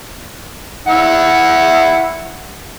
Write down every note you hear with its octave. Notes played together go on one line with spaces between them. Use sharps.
E4 E5 F#5